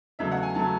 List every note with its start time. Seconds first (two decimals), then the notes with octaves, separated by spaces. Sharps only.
0.19 E2 C#3 F#3 A3 E5
0.31 F#5
0.43 G#5
0.55 C#3 F#3 A3 A5